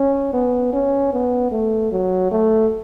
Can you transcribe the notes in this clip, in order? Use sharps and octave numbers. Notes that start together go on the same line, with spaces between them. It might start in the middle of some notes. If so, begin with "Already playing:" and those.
Already playing: C#4
B3
C#4
B3
A3
F#3
A3